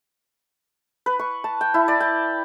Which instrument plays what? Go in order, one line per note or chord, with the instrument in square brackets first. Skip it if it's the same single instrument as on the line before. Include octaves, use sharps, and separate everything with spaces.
[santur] B4
C#6
A5
G5
E4
D5
G5